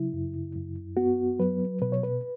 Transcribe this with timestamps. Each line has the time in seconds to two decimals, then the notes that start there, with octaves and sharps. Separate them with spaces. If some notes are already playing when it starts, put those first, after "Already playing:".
Already playing: C#3 F#3 E4
0.13 F#2
0.55 F#2
0.97 B3 F#4
1.40 F#3 B4
1.82 B2 B4
1.92 C#5
2.03 B4